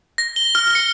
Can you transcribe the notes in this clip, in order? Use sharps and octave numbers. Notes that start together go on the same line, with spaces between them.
A#6
G7
F6
C#7